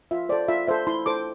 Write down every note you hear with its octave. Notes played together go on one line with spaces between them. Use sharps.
F4 E5
A4 C5 D5
F4 E5
A4 C5 E5
E4 C6
A4 C5 D6